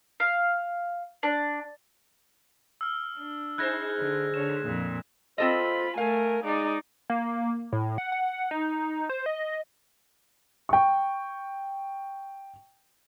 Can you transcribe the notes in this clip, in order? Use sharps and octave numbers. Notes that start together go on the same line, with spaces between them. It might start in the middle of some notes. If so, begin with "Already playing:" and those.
F5
D4
E6 F6
D4
D#4 G#4 C5 F#6 G#6 A#6
D3
D3 C#5 E7
F2 A#2
C4 F4 A4 C5 D#5 B5
A3 A#4 F5 G#5
G#3 D#4 D5
A#3
A2
F#5
F#5
D#4
C5
D#5
G5 C#6